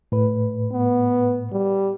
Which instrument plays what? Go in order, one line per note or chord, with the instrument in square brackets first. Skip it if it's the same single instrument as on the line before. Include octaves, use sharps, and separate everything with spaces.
[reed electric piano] A2 B4
[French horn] B3
G3